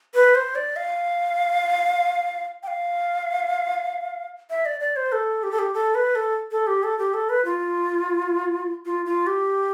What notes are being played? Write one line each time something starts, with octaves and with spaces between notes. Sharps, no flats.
B4
C5
D5
F5
G5
F5
E5
D5
D5
C5
A4
G4
A4
G4
A4
B4
A4
A4
G4
A4
G4
A4
B4
F4
F4
F4
G4